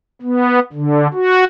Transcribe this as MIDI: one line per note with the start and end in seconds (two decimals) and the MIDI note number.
0.22 0.59 59
0.73 1.07 50
1.14 1.44 66